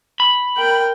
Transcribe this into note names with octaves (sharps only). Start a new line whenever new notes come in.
B5
A#4 G5